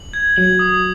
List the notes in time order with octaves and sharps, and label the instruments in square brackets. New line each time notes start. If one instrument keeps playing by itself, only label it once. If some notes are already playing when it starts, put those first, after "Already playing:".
Already playing: [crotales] F#7
G#6
[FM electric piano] F#3 [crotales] F#7
[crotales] D#6